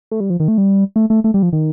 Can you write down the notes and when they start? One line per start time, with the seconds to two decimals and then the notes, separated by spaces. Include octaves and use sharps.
0.11 A3
0.20 G3
0.30 F3
0.40 D#3
0.48 A3
0.58 G3
0.96 A3
1.10 A3
1.24 A3
1.34 G3
1.43 F3
1.53 D#3